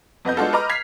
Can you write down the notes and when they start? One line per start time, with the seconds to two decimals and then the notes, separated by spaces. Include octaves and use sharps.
0.25 F2 B3 D#5 G6
0.37 G#3 B3 D4 F4 F#4 A4
0.53 B4 D#5 A#5 D6 F6
0.69 G#6 B6 C7 F7